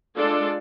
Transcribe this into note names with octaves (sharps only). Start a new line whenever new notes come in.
G#3 D4 F4 A4 D5